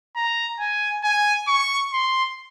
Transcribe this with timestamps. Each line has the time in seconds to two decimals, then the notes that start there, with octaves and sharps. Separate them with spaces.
0.16 A#5
0.59 G#5
1.03 G#5
1.48 C#6
1.93 C6